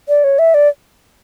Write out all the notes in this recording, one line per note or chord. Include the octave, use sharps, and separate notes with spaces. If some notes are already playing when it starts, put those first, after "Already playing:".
D5
C#5
E5
D5